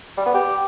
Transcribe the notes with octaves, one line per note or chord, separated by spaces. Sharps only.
G3
B3
G4